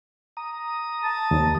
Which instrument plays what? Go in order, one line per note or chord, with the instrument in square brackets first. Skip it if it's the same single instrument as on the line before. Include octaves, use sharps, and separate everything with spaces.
[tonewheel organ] A#5 D#6
[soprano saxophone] A5
[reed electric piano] D#2